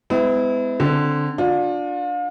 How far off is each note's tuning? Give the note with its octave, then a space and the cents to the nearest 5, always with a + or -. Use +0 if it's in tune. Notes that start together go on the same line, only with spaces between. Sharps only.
G#3 +0 B3 +45 E4 -10
D3 +0 C4 +0
D4 +0 F4 +35